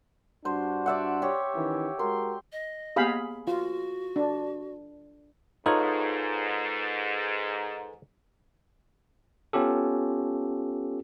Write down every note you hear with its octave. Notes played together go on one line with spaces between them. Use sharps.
G2 D4 F#4 C5
D5 E5 F#5
G4 C#5
D#3 E3 C#4
G#3 F#4 A#4 C6
D#5
A#3 B3 G4 G#4 F5 B5
F4 F#4
D4
G#2 D#4 F4 A4 B4 C#5
B3 C#4 F4 G4 A4